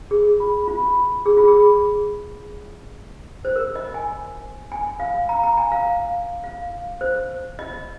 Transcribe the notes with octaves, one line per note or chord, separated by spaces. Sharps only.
G#4
F4
F4
G#4
F4
G#4
C5
A#4
D#5
G#5
G#5
F5
A#5
A#5
G#5
F5
F5
C5
D#5